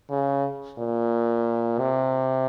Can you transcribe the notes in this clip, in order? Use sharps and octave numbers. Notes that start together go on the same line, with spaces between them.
C#3
A#2
C3